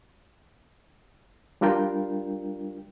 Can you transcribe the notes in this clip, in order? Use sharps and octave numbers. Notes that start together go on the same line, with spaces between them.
G3 D4 F4 A#4 G5